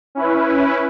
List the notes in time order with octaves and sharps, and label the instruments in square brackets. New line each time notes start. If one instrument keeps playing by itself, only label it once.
[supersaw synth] C#4 E4 B4